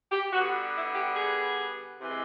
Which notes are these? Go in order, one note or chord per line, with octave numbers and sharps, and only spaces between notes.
G4
D3 G3 B3 F#4
E4
G4
G#4
C3 E3 G#3